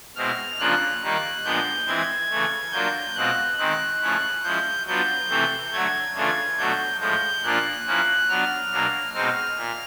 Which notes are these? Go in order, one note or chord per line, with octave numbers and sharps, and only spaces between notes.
B2 G#3 C4 E4 F6
C#3 F3 A#3 D4 F4 F#6
D#3 G3 A#3 D#4
A#2 F3 G#3 B3 D4 G6
E3 G#3 C4 E4 G#6
C#3 E3 A3
F#3 A#3 D4 F4 G6
B2 G#3 C4 F4 F#6
D#3 G#3 C4 F#6
C#3 F3 A3 C#4 E4
F3 G#3 C#4 E4 G6
F#3 B3 D4 F4 G6
C3 E3 A3 C4
D3 F#3 A3 G#6
C#3 E3 A3 D4 F4
B2 F#3 A3 D4 G6
A2 F3 G#3 G6
A#2 F3 A#3 D4 F4 F#6
F3 A#3 C#4 E4
F#3 B3 D4 F6
B2 F#3 A#3 D4
B2 G#3 C4 D#4 F6
A#2